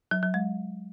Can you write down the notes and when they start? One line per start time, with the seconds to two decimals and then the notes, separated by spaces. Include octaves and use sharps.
0.11 F#3
0.23 F#3
0.34 G#3